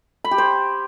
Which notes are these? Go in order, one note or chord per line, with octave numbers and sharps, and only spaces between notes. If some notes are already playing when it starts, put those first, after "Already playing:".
B5
G4
C5